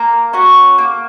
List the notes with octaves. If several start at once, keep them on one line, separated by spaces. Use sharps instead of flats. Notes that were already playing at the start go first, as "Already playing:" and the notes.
Already playing: A#3 A#5
C#4 F#4
A#3